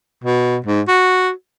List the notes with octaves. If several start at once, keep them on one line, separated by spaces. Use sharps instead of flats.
B2
G#2
F#4